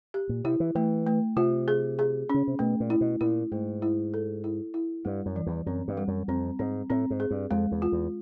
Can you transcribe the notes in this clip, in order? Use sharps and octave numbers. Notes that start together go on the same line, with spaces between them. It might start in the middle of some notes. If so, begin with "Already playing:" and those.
G4
A#2
C3 E4
E3
E3 A3
A3
C3 F4
G#4
G#4
C#3 C#4
C3
B2 A3
A#2
E4
B2
A#2 E4
G#2 A3
E4
A4
E4
E4
G2 G3
F#2
E3
E2
F#2 C4
G2
G3
F#2
F2 C4
G#2 C4
A2 C4
G#2
G#4
G2
F2 G#3
E2
F4
E2